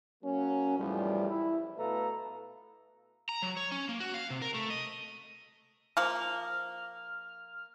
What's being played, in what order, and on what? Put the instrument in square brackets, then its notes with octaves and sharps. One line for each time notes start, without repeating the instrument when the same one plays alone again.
[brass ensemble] F#3 A#3 C#4
B1 E2 A2 F3 G3
E4
B2 A3 A4 B4 F5 A#5
[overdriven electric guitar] A#5
F#3
C#5
C#4
A#3
F#4
F5
C3
A#4
A3
D#5
[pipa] F3 A#3 [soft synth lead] F6